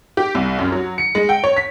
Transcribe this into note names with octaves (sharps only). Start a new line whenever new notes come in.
G4
C2
F#2
F#3
C#7
G#3
G5
C#5
B6